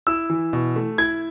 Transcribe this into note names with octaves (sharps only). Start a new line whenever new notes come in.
E4 E6
E3
B2
A3
E4 G#6